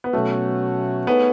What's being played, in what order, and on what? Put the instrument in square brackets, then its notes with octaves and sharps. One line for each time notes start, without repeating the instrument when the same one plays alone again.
[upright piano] B3
[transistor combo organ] B2 F#3 C#4 F#4 [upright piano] A3
[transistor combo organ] A3 D#4 G#4 C#5 [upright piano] B3